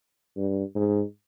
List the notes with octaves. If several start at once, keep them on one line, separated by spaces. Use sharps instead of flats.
G2
G#2